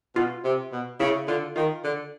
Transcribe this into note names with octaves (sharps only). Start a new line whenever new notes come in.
B2 F4
C3
B2
C#3 E4
D3 F4
D#3 F4
D3